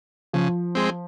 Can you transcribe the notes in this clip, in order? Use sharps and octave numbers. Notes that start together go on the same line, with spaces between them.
C#3 F3
G#3 C4